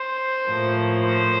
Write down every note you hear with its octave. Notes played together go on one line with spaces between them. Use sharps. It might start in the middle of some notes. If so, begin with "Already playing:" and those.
Already playing: C5
A2 F3 A#3
C5